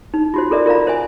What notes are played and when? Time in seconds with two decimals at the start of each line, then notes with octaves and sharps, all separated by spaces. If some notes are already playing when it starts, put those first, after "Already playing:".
0.14 D#4
0.34 F4 F#4 C5
0.51 F4 A4 A#4 D5 E5
0.66 F4 A#4 D5 F5 A#5
0.87 C5 E5 G#5